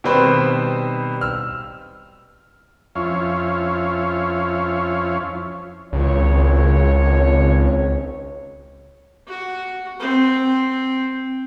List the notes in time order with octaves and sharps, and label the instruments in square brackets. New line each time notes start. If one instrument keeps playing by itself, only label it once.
[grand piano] B2 D#3 G3 C4 B4 C5
E6 F6
[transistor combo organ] F2 F3 C#4 E4 C#5 F5
[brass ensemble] G#1 C#5 [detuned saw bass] C#2
[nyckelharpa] F#4
C4